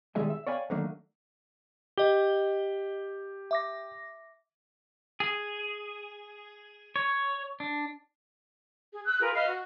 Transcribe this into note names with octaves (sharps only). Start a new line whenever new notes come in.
B1 D#3 G3 G#3 E5 G#5
E5
C#5 D5 F5 G5 G#5 B5
D3 D#3 F#3 A3 A#3
G4 D#5 G7
E5 D6 A#6
G#4
C#5
D4
G#4
E6 F#6
F4 G#4 A#4 B4
B4 D#5 F5 F6
F#4